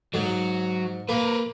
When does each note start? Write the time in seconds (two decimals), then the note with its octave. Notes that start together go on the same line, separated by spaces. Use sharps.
0.14 G#2 F#3 F#4
1.09 A#3 A#4 B4